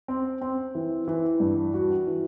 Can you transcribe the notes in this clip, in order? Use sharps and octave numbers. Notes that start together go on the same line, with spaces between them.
C4
C4
E3
E3
G2
F#4
E3